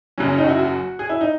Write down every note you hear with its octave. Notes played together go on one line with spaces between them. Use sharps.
F#1 F#2 C#3 F#3 C#4
C#4
D#4
F#4
E4
F#4
G#4
E4
D#4